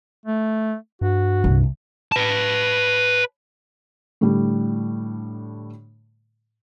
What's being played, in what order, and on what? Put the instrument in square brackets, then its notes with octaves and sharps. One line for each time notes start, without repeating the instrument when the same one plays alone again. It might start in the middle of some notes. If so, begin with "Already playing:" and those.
[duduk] A3
[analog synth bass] G2 [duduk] F#4
[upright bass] C2 D3
[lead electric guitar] B4 A5
[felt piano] A2 D3 G3